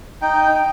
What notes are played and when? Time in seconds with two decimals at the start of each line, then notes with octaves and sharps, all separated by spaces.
0.22 D#4 G5
0.52 D#4